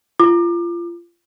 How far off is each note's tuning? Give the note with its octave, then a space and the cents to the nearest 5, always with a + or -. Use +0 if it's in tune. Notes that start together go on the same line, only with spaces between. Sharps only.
F4 -25 D6 +30